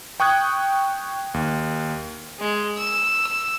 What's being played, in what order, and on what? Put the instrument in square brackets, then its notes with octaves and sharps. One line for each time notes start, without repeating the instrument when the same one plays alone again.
[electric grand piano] G5 C#6 D#6 F#6 G#6
D#2
[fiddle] G#3
E6